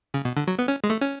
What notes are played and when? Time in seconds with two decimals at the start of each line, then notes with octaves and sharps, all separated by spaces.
0.14 C#3
0.25 B2
0.37 D3
0.47 F#3
0.59 B3
0.68 C#4
0.84 G#3
0.90 A3
1.01 C#4